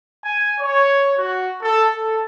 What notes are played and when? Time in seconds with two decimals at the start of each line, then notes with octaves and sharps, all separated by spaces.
0.23 G#5
0.59 C#5
1.17 F#4
1.62 A4
1.94 A4